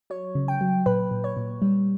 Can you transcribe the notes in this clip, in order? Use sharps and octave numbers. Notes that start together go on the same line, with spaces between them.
F#3 C#5
C#3
G5
F#3
A#2 B4
A#2
C#5
A#2
G3